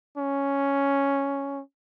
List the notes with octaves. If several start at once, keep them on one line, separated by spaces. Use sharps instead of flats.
C#4